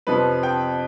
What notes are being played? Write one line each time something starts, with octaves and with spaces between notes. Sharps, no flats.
F2 C3 F3 B4
G5